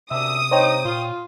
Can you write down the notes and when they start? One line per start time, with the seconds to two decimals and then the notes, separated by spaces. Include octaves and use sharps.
0.11 F#2 C3 D4 E5 D#6
0.51 G2 D#4 C5 C#5 G5
0.85 A#2 F4